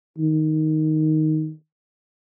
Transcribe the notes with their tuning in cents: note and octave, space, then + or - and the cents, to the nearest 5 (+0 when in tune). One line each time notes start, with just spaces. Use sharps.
D#3 +0